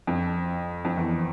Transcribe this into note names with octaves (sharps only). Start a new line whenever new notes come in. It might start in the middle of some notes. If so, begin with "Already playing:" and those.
F2
F2
E2